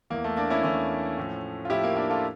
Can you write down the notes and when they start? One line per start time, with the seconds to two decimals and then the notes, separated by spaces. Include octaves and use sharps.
0.10 E2 E3 A#3
0.24 A3
0.37 A#3 D4
0.50 C#4 E4
0.63 E2 E3 A3 C#4
1.17 A2 F3
1.65 F4
1.70 A2 F3 E4 G4
1.84 A#3
1.96 A#3 D4
2.09 F4 A4